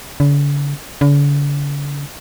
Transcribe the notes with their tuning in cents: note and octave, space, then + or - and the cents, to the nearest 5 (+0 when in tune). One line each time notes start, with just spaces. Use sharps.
D3 -45
D3 -45